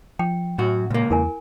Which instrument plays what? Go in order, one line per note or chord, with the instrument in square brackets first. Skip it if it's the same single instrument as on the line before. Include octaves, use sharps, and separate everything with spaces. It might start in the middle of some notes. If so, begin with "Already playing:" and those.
[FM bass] F3 [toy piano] G5
[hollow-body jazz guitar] F#2 F#4 [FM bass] A2
[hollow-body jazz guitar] C#2 A#3 [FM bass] A#2
[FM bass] E2 [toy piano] E4 A#4 G#5